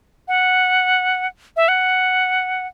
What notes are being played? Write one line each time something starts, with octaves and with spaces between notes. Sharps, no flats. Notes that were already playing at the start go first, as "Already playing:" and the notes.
F#5
E5
F#5